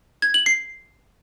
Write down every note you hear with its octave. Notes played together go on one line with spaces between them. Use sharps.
G#6
F#7
C7